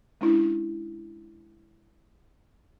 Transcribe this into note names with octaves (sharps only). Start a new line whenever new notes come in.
G#3 C#4 D4 E4